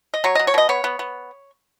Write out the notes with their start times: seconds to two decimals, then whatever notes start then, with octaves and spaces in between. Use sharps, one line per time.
0.14 D#5
0.24 F#3 C#5
0.35 F#3 D#5
0.47 C#5
0.54 B2 D#5
0.69 B3 C#5
0.84 B3
0.99 B3